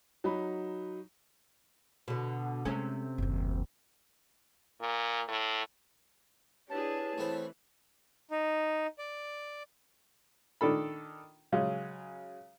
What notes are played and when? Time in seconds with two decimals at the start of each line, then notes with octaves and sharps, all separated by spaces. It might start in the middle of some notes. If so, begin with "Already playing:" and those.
0.24 F#3 D#4 B5
2.08 B2 D3
2.65 C3 G#3 A3 C#4
3.18 F#1 D#2
4.80 A#2
5.28 A2
6.70 D4 E4 G4 G#4 B4 C#5 A5
7.18 E3 A3 B3 C4
8.31 D#4
8.99 D5
10.61 D#3 D4 A4 B5
11.52 C#3 F#3 G#3